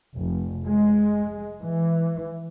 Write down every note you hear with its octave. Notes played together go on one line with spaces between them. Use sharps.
F1
G#3
E3